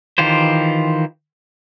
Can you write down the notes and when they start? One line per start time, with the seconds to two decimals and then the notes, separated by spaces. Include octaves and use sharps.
0.18 D#3 E3 F4 G4 C5